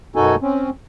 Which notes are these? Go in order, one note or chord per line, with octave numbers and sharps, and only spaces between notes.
F#2 B2 D#4 F#4 A4 G#5
C4 C#4